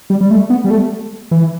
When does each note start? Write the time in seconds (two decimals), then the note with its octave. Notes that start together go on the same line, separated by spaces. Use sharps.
0.10 G3
0.21 G3
0.31 A3
0.50 B3
0.64 G3
0.71 A3
1.31 E3